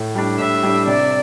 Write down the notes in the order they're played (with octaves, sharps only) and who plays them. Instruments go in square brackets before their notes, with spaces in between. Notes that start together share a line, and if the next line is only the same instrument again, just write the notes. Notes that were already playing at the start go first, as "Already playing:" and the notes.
Already playing: [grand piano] A2
G3 D4
[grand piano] A2 [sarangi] E5
[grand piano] G3 D4
[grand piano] C3 [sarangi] D5